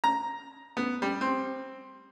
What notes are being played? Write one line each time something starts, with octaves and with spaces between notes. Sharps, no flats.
A#5
B3
G3
C4